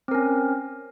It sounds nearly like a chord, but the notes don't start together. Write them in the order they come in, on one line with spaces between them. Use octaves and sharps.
C4 A#4 C#4